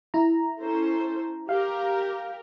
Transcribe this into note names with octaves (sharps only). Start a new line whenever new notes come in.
E4 A#5
C#4 A4 C5
G4 A#4 F5